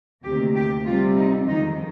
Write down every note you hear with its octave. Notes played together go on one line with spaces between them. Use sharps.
D2 C3 D#3 A#3 G4
G4
C3 G3 C4 F4
D#4
F2 D#3 G#3 D#4